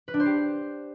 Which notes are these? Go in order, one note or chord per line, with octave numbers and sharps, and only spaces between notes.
B4
D4
C5
G4